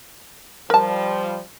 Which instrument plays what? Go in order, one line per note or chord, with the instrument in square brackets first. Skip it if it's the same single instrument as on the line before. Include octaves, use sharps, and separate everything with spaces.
[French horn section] F3 G3 [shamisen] A#4 A5